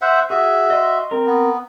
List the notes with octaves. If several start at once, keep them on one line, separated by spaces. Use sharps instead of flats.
C5 E5 F#5
F#4 G#4 E5
D#5 C6
C4 A#4
B3